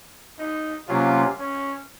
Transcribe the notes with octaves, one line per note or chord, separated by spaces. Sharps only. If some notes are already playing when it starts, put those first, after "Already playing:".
D#4
C3 F#3 A#3 C#4 F4
C#4